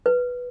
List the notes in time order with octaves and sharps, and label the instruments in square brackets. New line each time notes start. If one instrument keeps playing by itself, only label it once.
[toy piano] B4